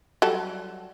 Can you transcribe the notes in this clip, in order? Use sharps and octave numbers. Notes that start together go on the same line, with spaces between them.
F#3 G3 A4